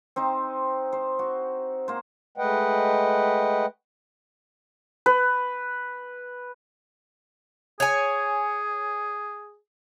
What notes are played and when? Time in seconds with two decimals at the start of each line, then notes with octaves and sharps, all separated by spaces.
0.16 C4 D#4 C5
0.92 C5
1.19 F#4
1.88 A#3 C5
2.38 G#3 A3 B4 D#5 F#5 G5
5.06 B4
7.80 G#4 C#5 G#5